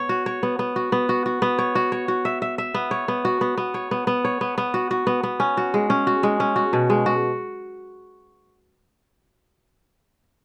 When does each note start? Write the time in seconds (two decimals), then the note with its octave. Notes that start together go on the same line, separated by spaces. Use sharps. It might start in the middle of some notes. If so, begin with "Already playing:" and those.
Already playing: B3 C#5
0.09 F#4
0.26 C#5
0.43 B3
0.59 B3
0.76 F#4
0.92 B3
1.09 F#4
1.26 F#4
1.42 B3
1.59 C#5
1.75 F#4
1.92 C#5
2.08 F#4
2.25 E5
2.42 E5
2.58 E5
2.74 B3
2.91 C#5
3.08 B3
3.25 F#4
3.41 B3
3.57 B3
3.74 C#5
3.91 B3
4.07 B3
4.25 C#5
4.41 B3
4.58 B3
4.74 F#4
4.91 F#4
5.07 B3
5.23 B3
5.40 C#4
5.57 F#4
5.74 G#3
5.90 C#4
6.07 F#4
6.23 G#3
6.40 C#4
6.56 F#4
6.73 B2
6.90 G#3
7.06 F#4